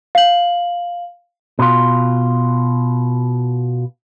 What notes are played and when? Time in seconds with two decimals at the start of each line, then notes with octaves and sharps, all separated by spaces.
0.15 F5 F#7
1.59 B2 F4